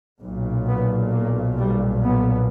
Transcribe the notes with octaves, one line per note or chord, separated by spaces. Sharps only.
B1 A#2
B3
A#3
G3
B3